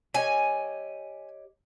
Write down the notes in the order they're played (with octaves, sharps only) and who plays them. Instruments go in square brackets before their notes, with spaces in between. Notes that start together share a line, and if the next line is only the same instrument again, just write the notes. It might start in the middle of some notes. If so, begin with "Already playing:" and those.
[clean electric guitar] G4 C#5 D#5 [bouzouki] G#5